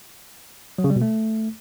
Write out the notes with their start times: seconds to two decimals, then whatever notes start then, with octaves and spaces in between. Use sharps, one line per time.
0.78 F#3
0.84 C#3
0.90 G3
0.96 B2
1.02 A3